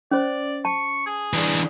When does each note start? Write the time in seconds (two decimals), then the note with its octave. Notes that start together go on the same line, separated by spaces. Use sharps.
0.11 C#4 C5 D5
0.65 A5 C#6
1.06 G#4
1.33 E3 D4